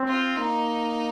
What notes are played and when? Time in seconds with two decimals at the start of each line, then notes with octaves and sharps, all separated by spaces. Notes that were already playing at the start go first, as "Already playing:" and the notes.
Already playing: C4
0.08 F4
0.37 A#3 D#4